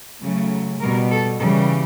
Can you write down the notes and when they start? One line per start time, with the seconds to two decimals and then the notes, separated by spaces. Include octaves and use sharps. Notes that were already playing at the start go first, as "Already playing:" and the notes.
0.22 C#3 F#3 A3
0.80 B2 G3 A#4
1.11 A4
1.39 C#3 E3 G3 A4